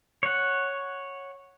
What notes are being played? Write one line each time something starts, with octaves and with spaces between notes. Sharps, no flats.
C#5 F#5